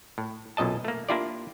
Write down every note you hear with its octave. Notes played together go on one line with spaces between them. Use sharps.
A2
B1 F#2 A#2 D#5 A5
A3 A#3
A#3 D4 E4 F4 G4 D5